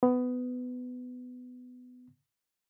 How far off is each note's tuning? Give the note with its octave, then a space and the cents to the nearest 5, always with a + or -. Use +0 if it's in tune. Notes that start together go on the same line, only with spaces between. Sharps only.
B3 +15